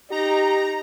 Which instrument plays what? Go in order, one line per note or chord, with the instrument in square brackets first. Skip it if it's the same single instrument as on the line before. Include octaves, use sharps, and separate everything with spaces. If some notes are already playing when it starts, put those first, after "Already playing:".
[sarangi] D#4 [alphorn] G4 [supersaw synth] A#5